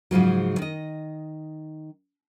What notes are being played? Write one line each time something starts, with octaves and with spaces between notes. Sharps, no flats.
G#2 C#3 F3 F#3
D#3 D#5